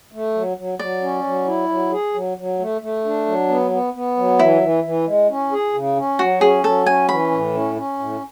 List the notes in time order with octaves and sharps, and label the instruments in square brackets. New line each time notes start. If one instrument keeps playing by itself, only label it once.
[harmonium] A3
F#3
F#3
[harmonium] F#3 [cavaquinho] D5
[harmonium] C#4
F#3
E4
F#3
G#4
F#3
F#3
A3
A3
D4
F#3
B3
B3
B3
F#3
[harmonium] E3 [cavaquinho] E4
[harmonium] E3
E3
G#3
C#4
G#4
C#3
C#4
[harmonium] F#3 [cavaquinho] F#4
[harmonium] C#4 [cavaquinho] G#4
[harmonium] F#3 [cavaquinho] A4
[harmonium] C#4 [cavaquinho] G#5
[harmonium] E3 [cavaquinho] B5
[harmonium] A2
C#4
C#4
A2